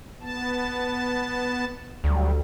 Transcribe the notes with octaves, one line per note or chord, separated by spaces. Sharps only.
B3 A5
D2 F#3 G3